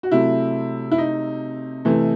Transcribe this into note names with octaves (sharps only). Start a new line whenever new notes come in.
F#4
C3 F#3 A3 E4
E4
D#4
C3 E3 A3